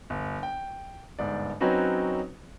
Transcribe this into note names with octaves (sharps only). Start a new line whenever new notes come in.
G1
G5
G1 G#2 D5
F#3 C4 C#4 D#4 F#4 B4